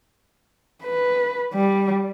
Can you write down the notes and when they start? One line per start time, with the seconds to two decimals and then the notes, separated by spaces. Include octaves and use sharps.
0.84 B4
1.53 G3